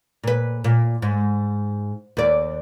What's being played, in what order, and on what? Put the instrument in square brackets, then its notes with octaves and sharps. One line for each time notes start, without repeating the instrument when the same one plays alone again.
[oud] A#2 B4
A#2
G#2
D#2 D5